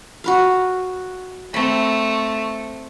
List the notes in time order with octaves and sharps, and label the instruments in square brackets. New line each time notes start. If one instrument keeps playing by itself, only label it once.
[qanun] F#4 B4 F5
[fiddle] A3 [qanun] C4 B5